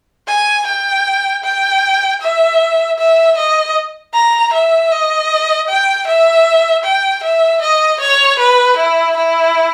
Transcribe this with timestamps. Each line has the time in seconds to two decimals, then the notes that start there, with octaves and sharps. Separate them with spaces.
0.28 G#5
0.67 G5
1.44 G5
2.21 E5
2.98 E5
3.37 D#5
4.14 A#5
4.53 E5
4.91 D#5
5.68 G5
6.07 E5
6.84 G5
7.24 E5
7.62 D#5
8.00 C#5
8.39 B4
8.77 E4
9.16 E4